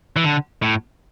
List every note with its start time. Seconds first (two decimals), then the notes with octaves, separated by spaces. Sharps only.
0.16 E3
0.24 D3
0.62 A2